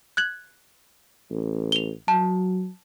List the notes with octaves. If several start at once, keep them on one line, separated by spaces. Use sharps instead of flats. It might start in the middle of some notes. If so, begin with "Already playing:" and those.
F#6 G#6 F#7
A1
F7 G7
F#3 A5